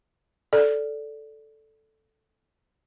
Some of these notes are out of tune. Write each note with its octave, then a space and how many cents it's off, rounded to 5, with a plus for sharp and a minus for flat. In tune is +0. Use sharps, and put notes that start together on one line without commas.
A4 +0 D5 -10